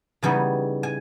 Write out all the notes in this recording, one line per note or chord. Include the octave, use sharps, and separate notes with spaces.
C#3 E3 G3 B3 D#4 G#5
G#5